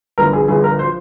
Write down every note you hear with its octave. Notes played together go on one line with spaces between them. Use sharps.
G1 G2 F3 A#4
G#4
G1 G2 F3 G#4
A#4
C5
F3